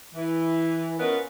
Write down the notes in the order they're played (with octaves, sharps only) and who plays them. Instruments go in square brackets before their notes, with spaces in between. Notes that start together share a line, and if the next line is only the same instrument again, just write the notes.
[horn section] E3
B3 C#4 F4 A#4 B4 D#5